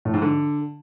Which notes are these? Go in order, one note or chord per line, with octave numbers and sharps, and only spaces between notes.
A2
G#2
D3